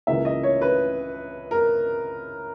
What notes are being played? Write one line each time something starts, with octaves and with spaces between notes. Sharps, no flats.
C#2 C#3 E3 A#3 E5
D#5
C#5
B4
A#4